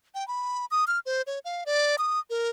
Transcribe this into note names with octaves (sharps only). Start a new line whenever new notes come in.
G5
B5
D#6
F6
C5
C#5
F5
D5
D#6
A#4